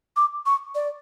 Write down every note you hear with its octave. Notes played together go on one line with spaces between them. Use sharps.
D6
C#6
D5